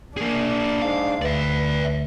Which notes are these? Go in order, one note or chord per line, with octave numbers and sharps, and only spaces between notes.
A#3 D4 G#4
G#2 F5
D2 B4 D5 E5